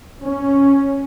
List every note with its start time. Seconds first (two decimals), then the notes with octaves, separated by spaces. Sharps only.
0.23 C#4